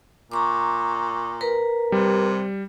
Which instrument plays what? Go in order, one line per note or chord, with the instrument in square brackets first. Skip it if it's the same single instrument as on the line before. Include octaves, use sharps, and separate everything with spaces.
[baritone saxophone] A#2 [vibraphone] A#5 C#6 D6
[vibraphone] A#4 B4 A#5
[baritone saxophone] C3 [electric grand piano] G3